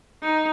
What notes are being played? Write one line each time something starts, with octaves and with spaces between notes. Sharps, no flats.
D#4